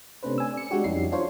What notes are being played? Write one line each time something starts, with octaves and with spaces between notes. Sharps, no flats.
C3 A3 C#4 D4 B4 C5
G#5 E6
D5 C#7
G#3 D4 F#4 G4
F2 G3 C#4 D#4 E4 C7
D4 F4 C5 C#5